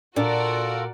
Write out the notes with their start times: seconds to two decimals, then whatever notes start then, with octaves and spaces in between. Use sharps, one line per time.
0.16 A#2 D4 F4 F#4 A4 A#4 D5